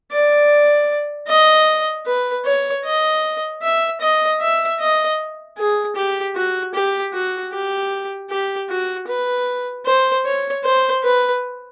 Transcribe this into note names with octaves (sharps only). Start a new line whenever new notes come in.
D5
D#5
B4
C#5
D#5
E5
D#5
E5
D#5
G#4
G4
F#4
G4
F#4
G4
G4
F#4
B4
C5
C#5
C5
B4